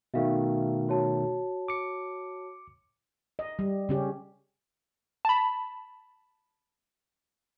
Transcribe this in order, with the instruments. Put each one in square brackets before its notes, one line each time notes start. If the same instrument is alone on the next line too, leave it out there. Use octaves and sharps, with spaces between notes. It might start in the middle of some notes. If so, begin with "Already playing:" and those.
[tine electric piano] B2 D#3 A3 [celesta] E5 F5
[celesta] F#4 C#5 A5
[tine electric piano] D6 C#7
[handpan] D#5
G3
C#3 C#4 G4
[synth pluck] A5 B5